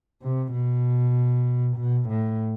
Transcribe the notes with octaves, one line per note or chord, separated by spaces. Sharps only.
C3
B2
B2
A2